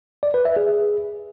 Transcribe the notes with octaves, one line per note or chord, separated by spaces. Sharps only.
D5
B4
E5
G#4